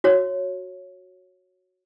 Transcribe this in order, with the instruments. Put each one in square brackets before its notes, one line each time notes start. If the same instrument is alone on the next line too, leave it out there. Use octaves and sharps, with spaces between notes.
[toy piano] F#4 C#5